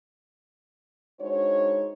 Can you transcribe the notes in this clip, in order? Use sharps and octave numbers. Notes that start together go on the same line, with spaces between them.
G#3 D4 D#4 F#4 C5 C#5